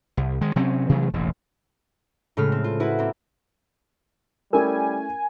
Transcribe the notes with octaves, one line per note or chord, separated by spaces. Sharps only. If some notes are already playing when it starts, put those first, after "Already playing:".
C2
D#3 G#3
C3 F#3 C4 C#4
C3 E3 F#3 A3
E1 A1 D#2
A2 C#3 G#3 A3 F6
C4
F4
E4 F#4 B4
A#3 C4
G3 A3 C#4 E4 A#4 G#5